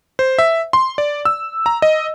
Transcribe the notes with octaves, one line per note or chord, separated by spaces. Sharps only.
C5
E5
C6
D5
E6
A#5
D#5